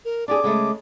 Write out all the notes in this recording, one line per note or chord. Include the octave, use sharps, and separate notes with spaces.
A#4
D4 G4 G#4 D6
C#3 G#3 A3